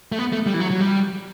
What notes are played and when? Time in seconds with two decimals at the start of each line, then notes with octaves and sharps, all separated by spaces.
0.12 A3
0.19 B3
0.33 A3
0.47 G3
0.54 E3
0.60 F#3
0.71 F#3
0.80 G3